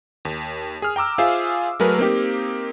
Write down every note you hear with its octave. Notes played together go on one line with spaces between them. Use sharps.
D#2
G#4 F6
G5 A#5 D6 E6
F4 G#4 C5 E5 F5
F#3 A3 G#4 A#4 B4
A#3 C4 D#4 G4